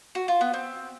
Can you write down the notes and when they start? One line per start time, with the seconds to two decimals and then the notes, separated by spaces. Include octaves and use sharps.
0.15 F#4
0.28 F4
0.41 B3
0.54 C4